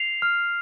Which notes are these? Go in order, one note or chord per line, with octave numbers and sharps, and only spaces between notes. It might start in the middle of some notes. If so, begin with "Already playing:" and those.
Already playing: C7 F7
F6